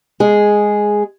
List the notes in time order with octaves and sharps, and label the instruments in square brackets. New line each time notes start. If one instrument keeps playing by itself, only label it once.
[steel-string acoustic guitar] G#3 G#4